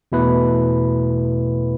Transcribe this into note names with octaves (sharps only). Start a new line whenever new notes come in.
E2 B2 A3 E4 B4